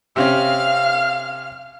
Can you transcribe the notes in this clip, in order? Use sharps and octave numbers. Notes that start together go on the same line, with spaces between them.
C3 C4 C#4 F5 F6